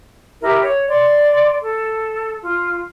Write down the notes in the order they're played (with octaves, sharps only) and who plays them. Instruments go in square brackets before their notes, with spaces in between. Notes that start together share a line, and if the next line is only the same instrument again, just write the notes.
[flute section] E4 G4 A#4
C#5
D5 C6
A4
F4